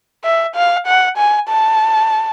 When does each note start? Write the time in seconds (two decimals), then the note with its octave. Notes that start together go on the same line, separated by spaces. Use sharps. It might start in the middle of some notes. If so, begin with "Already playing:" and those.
0.24 E5
0.56 F5
0.87 F#5
1.18 G#5
1.49 A5